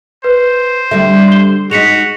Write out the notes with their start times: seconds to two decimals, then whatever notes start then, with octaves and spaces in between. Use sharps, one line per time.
0.24 B4 C5
0.91 D3 G3 A3 E5
1.28 C6 G7
1.71 G#3 D#4 F#4 B6 C#7 F7